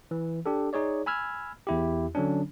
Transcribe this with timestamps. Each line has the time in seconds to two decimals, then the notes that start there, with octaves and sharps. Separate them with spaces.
0.11 E3
0.46 D4 G4 A4
0.73 D#4 G#4 C#5 D5
1.06 G#5 B5 E6 F6 G#6
1.67 E2 E4 G4
2.15 D3 F#3 C#4 D4